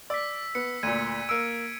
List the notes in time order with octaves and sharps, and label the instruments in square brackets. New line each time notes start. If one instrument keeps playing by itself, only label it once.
[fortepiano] D5 [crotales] E6 B6
[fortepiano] B3 [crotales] C#7
[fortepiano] D2 A#2 [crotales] G#6 D#7
[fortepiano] A#3 E6 [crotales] D7